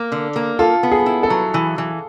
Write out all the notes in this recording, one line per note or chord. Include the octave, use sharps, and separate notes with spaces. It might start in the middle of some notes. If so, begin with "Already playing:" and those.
Already playing: A#3
D3
A#3
F4 A4
B3
G#4
E4
A4
F#3
E3
E3